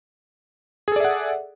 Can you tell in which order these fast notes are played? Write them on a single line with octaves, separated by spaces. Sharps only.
G#4 A4 D5 E5 F#5